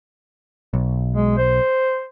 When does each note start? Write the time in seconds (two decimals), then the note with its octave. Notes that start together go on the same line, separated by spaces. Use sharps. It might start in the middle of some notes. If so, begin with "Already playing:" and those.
0.74 B1
1.13 G#3
1.37 C5